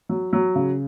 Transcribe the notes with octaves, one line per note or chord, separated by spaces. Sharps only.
F#3
F#3
C#3